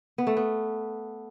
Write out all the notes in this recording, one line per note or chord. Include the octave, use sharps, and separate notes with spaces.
B3
A3
B3